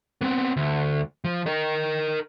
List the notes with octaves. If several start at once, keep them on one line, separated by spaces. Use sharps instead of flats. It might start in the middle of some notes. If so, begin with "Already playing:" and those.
B3 C4
D2
F3
A#4 D#5